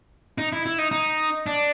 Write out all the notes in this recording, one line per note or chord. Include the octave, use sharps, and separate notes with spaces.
D#4
E4
E4
D#4
D#4
D4